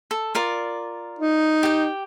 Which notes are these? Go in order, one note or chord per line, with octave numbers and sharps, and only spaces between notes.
A4
F4 A#4 D5
D#4
G4 G5